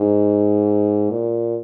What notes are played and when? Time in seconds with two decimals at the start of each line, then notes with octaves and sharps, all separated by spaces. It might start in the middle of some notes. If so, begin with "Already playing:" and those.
Already playing: G#2
1.10 A#2